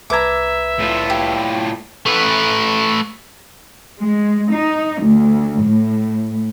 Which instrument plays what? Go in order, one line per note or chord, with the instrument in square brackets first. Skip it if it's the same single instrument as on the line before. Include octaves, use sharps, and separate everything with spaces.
[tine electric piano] C2 B4 G#6 [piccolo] E5 [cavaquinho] A#5 D6
[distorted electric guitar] A2 F4
[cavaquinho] G4
[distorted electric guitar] A3 B4
[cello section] G#3
D#4
D2
A2